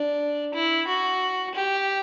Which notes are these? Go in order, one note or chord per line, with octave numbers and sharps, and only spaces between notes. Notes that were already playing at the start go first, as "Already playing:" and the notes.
Already playing: D4
E4
F#4
G4